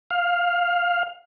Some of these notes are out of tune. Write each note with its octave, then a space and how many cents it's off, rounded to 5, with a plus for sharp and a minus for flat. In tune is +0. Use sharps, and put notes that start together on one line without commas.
F5 +10